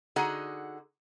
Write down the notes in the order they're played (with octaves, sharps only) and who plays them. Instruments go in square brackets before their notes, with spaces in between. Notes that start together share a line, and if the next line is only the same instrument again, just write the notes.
[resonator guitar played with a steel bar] D3 D#4 F#4 G#4 F#5